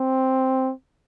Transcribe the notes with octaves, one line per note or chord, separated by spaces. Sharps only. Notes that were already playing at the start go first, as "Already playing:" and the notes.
Already playing: C4